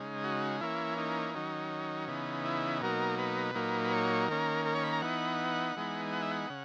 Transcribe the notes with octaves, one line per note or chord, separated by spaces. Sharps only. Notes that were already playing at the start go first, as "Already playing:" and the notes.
Already playing: C#3 G#3 D#4
F#4
E3 A#3 C#4 E4
D#4
D#3 F#3 C#4
C#3 E3 B3 D#4
E4
B2 F#3 A#3 D#4 A#4
B4
A#2 F#3 A#3 D#4
B4
C#5
D#3 A#3 C#4 A#4
A#4
C#5
B5
A#5
E3 B3 D#4 F#5
E3 G#3 B3 D#4
F#5
E5
F#5
C#3